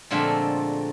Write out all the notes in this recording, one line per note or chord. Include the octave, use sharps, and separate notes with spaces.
A#2 D3 F3 G#3 A3 C4